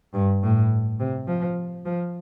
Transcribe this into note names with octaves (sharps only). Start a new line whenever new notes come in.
G2
A2
C3
F3
F3